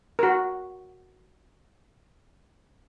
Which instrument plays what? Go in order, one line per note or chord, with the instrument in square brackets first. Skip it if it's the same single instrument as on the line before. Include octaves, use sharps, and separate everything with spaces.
[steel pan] F#4 A#4